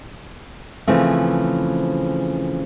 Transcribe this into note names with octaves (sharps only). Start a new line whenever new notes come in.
C#3 E3 F3 A3 C4